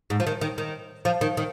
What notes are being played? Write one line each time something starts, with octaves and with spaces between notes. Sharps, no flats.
G#2
F3
D#3
D#3
D#3
F3
D#3
D#3